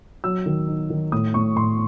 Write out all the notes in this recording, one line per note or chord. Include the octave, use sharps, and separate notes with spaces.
F#3 E6
D#3
D#4
D#3
A2 D#6
A2 C#6
A2 C6